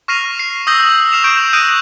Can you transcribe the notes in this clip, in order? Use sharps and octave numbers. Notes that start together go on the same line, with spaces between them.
C#6 F6 A#6 C7 D#7 F7
C7
D#6 E6 G6 A#6 F#7
D#6 F6 C7 E7 F7
C#6 G6 D7
D#6 F#6 G6 A#6 D7 D#7